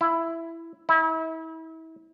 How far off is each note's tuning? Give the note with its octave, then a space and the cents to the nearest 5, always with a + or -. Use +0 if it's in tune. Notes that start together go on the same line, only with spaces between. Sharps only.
E4 +10
E4 -35